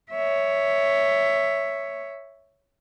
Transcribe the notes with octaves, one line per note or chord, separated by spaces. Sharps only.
C#5 E5